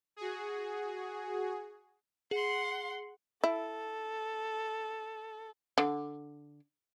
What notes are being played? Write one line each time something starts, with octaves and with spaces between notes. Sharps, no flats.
F#4 G#4
G#4 F#5 C6
E4 A4
D3